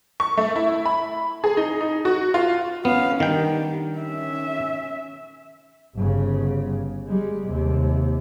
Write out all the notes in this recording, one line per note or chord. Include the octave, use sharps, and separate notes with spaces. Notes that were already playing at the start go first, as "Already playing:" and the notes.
C#6
A3
E4
B5
G#4
D#4
D#4
F#4
F4
B3 C#4 F5
D#3 G3 D4 G5
C#4 E5
G1 C#3
G3 G#3
D#2 C3